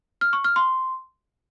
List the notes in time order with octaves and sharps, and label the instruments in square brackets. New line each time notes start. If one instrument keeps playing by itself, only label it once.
[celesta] F6
C#6
F6
C6